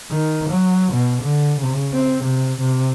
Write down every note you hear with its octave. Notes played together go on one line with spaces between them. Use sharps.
D#3
F#3
B2
D3
C#3
C4
C3
C3